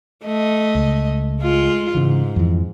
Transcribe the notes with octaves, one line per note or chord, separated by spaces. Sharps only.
A3 D#5
C#2
G#3 F4
G#2 C#3 E3
F2 E3